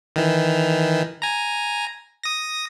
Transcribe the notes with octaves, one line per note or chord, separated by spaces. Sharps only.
D#3 E3
G#5 A#5
D#6 A#6